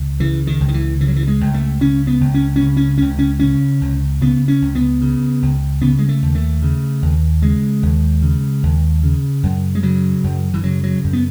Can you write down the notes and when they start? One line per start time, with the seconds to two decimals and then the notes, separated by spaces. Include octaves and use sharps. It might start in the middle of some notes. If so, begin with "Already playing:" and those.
Already playing: C#2
0.20 C#3 E3
0.47 D#3
0.61 C#2
0.68 D#3
0.74 E3
1.00 C#3 E3
1.08 F#3
1.16 E3
1.28 G#3
1.41 C#2
1.54 A3
1.80 C#3 C#4
2.07 B3
2.21 C#2
2.34 C#4
2.56 C#3 C#4
2.77 C#4
2.98 C#2 C#4
3.19 C#4
3.40 C#3 C#4
3.81 C#2
4.21 C#3 B3
4.48 C#4
4.62 C#2
4.75 B3
5.01 C#3
5.42 C#2
5.82 C#3 B3
5.98 G#3
6.08 A3
6.22 D#2
6.35 A3
6.62 C#3
7.02 D#2
7.42 C#3 G#3
7.83 D#2
8.22 C#3
8.63 D#2
9.03 C#3
9.43 F#2
9.75 G#3
9.83 C#3 F#3
10.24 F#2
10.54 E3
10.63 C#3 F#3
10.84 F#3
11.04 F#2
11.13 B3